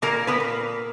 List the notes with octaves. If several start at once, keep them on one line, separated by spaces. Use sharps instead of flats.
A#2 A#3 A#4
B3 B4
A#3